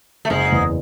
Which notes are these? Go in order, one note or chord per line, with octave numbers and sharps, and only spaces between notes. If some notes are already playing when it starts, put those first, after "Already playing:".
A3
F#1 G#2 G#3
E2